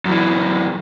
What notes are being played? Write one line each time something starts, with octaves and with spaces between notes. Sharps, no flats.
F#2 E3